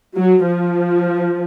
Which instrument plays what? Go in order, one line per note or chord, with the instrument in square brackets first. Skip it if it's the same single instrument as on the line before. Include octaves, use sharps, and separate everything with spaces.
[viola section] F#3
F3